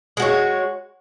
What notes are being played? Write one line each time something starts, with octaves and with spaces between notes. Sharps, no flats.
G#3 F#4 C#5